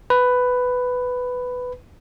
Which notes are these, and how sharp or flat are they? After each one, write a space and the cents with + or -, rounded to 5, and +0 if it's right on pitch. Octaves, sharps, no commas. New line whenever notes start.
B4 +10